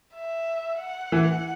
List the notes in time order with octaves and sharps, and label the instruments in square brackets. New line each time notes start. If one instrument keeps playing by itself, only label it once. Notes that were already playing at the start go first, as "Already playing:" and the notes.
[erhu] E5
F#5
[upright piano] E3